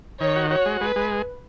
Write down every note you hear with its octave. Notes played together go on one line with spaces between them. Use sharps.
D#3 C#5
F#4
F#4 C#5
G#3
G#3 B4
G#3